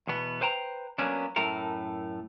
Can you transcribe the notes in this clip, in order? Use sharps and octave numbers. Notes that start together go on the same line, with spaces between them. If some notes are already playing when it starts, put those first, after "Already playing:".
E2 B2 B3
B4 C5 G5 A5 A#5
F#3 A#3 B3 C#4 D4
F#2 A2 A3 A4 A#4